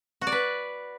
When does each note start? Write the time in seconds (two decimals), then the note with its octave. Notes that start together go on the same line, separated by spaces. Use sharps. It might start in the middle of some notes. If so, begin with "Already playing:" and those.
0.21 F#4
0.27 D5
0.32 B4